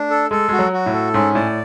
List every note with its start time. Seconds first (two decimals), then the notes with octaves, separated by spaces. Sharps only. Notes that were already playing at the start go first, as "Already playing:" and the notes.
Already playing: A3 D4
0.10 A4
0.31 G#3 A4
0.49 G#3 F#4
0.59 F#3
0.72 F#4
0.86 A2
0.93 A4
1.14 G#2 C#4
1.35 A2 D5